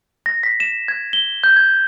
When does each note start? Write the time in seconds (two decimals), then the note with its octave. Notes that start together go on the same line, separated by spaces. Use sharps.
0.26 A#6
0.43 B6
0.60 E7
0.88 G#6
1.13 G7
1.44 G6
1.56 G#6